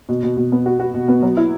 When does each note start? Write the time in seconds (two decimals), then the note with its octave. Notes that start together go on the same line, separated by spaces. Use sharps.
0.09 B2
0.23 B2
0.37 B2
0.52 B3
0.66 F#4
0.80 F#4
0.94 B2
1.08 B3
1.22 F#3
1.37 E4